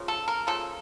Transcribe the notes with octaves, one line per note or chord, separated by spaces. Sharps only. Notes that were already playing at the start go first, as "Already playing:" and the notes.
Already playing: C#3 F3 A#3
A4
A#4
C#3 F3 A#3 A4